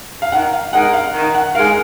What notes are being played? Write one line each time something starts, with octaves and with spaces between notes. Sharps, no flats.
F5
D#3 F#5
F5
G#3 D#4 A#4 F#5
F5
D#3
F#5
G#3 D#4 A#4 F5
G#5